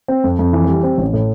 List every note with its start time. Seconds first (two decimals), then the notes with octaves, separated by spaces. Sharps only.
0.08 C4
0.24 F2
0.39 F2
0.53 E3
0.67 G3
0.83 C4
0.98 A1
1.13 A2